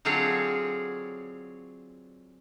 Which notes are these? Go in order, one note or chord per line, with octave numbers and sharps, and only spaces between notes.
D3 F#3 C4 F4 G#4 C#5